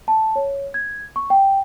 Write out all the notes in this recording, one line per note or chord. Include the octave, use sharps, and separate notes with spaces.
A5
C#5
G#6
C#6
G5